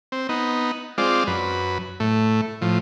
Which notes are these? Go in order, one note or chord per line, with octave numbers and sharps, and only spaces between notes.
C4
B3 D#4
G#3 C4 F4 D5
F#2 B4
A2 A3
A2 F3